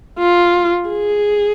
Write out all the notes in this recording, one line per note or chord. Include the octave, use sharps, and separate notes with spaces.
F4
G#4